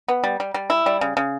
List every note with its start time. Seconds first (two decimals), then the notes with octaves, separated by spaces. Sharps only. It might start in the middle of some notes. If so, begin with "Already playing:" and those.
0.08 B3
0.24 G3
0.40 G3
0.54 G3
0.70 E4
0.86 G3
1.01 C#3
1.17 C#3